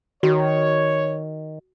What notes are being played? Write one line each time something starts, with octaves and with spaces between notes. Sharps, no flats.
D#3 F#4 C#5